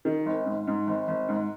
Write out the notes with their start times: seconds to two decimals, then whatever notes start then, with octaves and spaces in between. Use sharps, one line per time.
0.05 D#3
0.26 G#1
0.46 G#2
0.67 G#2
0.87 G#1
1.08 G#1
1.29 G#2